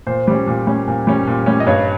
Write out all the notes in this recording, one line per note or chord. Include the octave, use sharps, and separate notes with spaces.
A#2 C5
G3 C#4
A#2
G3 C#4
A#2
G3 C#4
A#2
G3 C#4
D#5
G2 C#5